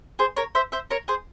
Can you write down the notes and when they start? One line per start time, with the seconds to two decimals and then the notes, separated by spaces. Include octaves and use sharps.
0.19 G#4 C5
0.37 A#4 C#5
0.55 C5 E5
0.72 C5 E5
0.91 A#4 C#5
1.08 G#4 C5